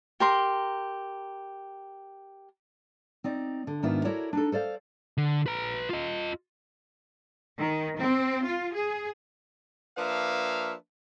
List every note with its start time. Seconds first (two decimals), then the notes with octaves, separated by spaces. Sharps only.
0.20 G4 A#4 C6
3.24 C4 D#4 D5
3.67 D3
3.83 G#2 D#3 B3 D4 E4 F4
4.05 E4 F#4 A4 A#4 C#5 D5
4.33 D4 D#4 A4
4.52 A4 C5 D5 F5
5.18 D3
5.46 B4 A#5
5.89 F4 D#5
7.58 D#3
7.99 C4
8.45 F4
8.74 G#4
9.97 F3 A#3 D4 B4 E5 F5